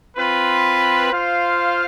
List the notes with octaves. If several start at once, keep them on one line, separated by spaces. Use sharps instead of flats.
C4 F4 B4
F4 C5 F5